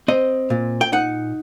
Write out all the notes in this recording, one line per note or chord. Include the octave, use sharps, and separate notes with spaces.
C4 D#5
A#2
G5
D#4 F#5